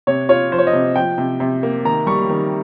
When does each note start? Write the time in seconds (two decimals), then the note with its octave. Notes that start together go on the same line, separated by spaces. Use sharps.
0.07 C3 C#5
0.29 F4 C#5
0.52 F3 C5
0.58 C#5
0.67 D#5
0.73 C3
0.96 F3 G5
1.18 C3
1.40 C3
1.63 A#3
1.85 D#3 A#5
2.06 G3 C#6
2.29 D#3